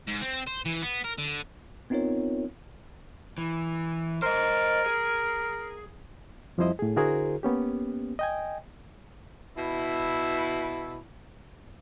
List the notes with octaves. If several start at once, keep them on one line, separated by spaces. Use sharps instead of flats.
G#2
C4
C5
E3
B3
A#4
D3
B3 C4 D#4 F4 A#4 C#5
E3
A#4 C5 D#5
G#4
F2 F3 G3 E4 C5 D#5
A2 G#4
D3 E4 F#4 G#4 A#4 C5
A#3 B3 C#4 G4
D#5 G5 G#5
B2 E4